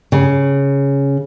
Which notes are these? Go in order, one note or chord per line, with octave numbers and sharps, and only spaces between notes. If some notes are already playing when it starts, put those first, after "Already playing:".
C#3